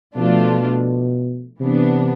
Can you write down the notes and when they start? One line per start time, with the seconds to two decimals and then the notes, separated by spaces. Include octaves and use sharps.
0.15 B2 F3 A3 D4 F4
1.60 C3 E3 B3 D4